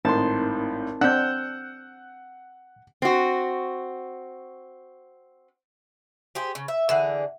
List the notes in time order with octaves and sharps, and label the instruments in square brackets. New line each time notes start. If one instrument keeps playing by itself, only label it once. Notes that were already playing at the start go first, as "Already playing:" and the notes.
[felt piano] G#1 A2 [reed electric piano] C4 D#4 A#4 [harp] A5 C6
[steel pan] C4 D4 [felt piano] F#5 [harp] E6 G6 [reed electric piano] F#6
[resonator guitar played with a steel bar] C4 F#4
[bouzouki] G4 G#4 C5
C#3
E5
[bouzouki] D3 E3 G#4 [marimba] E5 F#5